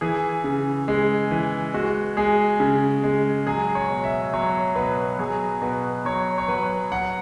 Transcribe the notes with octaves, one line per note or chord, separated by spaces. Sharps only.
E3 G#4
C#3
G#3
E3
G#3 F#4
G#3 G#4
C#3
G#3
F#3 G#4
C#5
B2
E5
F#3 C#5
B2 B4
F#3 G#4
B2 B4
F#3 C#5
C#5
F#3 B4
F#3 F#5